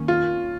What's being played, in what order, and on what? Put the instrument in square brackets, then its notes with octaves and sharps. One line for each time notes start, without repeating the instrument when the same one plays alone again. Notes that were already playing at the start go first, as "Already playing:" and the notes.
Already playing: [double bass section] D#2 D#3 A#3 C#4
[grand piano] F4